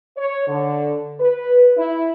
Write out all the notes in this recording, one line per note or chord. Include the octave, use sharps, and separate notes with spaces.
C#5
D3
B4
E4